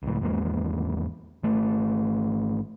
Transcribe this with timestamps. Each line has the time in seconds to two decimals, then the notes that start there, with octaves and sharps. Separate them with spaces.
0.03 C#2 A2
0.21 G#1 E2 G#3 A#3
1.43 G#1 A3